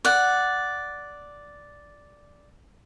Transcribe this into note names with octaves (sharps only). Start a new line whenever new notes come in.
D5 F#5